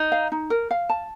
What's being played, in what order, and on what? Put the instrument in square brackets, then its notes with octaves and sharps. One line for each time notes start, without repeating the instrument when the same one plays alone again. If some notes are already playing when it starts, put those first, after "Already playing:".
Already playing: [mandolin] D#4
[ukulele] F5
D#4
A#4
F5
A5